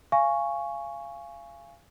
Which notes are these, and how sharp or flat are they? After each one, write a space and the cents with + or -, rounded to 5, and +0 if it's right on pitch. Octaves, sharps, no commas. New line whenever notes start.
F5 -25 G#5 +0 C#6 +0